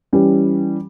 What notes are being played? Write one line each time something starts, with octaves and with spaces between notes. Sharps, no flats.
E3 G3 C#4